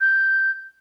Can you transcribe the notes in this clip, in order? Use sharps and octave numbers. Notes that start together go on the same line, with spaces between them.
G6